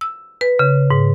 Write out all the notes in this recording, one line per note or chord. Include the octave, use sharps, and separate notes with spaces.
E6
B4
C#3
G#2